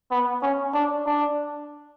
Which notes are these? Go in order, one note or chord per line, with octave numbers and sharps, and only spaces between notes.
B3
C#4
D4
D4